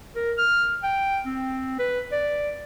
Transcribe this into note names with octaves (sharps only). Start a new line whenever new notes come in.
A#4
F6
G5
C4
B4
D5